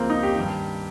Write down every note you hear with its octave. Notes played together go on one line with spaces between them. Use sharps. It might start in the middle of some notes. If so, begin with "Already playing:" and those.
Already playing: C#2 C#3 F3 A#3 C4
D#4
G4
G2 D#3